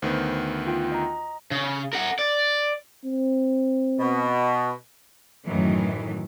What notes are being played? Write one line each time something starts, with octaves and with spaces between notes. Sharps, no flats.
D2 D#3 B3 C5
F4 G5
D#5 A#5
C#3
A#4 F#5
D5
C4
B2
F#2 A2 D#3 E3 F#3